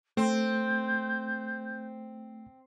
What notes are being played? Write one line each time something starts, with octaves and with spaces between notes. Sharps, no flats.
A3 C4 G6